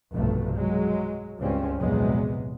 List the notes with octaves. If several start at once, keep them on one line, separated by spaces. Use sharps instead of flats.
F1 B1 G2 B2 A3
F#3 G#3
C#2 G2 C4 C#4
A#1 E2 C3 F#3 G#3 B3